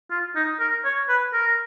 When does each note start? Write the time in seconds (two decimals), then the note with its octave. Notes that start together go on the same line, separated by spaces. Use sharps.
0.10 F4
0.36 D#4
0.60 A#4
0.85 C#5
1.09 B4
1.33 A#4